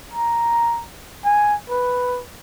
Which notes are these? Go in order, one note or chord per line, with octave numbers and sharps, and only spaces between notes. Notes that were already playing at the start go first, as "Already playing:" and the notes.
A#5
G#5
B4